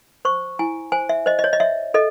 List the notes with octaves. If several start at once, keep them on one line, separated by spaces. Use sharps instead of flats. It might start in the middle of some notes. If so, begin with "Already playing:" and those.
C5 C#6
E4 G#5
C5 G#5
E5
C5 D#5
D#5
C#5
D#5
C#5 E5
A4 D#5